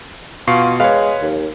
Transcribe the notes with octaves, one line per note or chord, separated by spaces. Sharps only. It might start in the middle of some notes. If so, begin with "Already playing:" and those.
B2 F4 C#6 C7
G#3 B4 C#5 F5
D#2